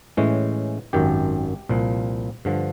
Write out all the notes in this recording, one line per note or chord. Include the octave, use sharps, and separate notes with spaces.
A2 E3 G#3 C#4
G#1 F#2 D#3 G4
C2 A#2 F3
G2 D3 F3